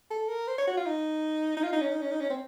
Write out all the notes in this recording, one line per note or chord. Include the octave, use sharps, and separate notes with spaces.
A4
A#4
C5
C#5
F#4
F4
D#4
D#4
F4
D#4
C#4
D#4
C#4
D#4
C#4
C4